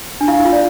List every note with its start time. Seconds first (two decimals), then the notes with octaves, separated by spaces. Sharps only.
0.21 D4
0.28 E4 F5
0.40 E4
0.45 F4
0.52 D5